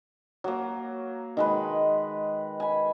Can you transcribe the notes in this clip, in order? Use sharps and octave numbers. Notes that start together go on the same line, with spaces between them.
F#3 A#3
D#3 G#3 B4
G#5 B5